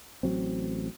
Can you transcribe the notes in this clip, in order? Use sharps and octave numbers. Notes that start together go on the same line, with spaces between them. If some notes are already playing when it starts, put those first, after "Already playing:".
A1 F#3 C4